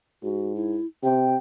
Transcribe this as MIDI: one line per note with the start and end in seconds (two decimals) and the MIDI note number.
0.23 0.79 44
0.23 0.53 66
0.55 0.86 64
1.03 1.36 48
1.03 1.26 67
1.03 1.37 79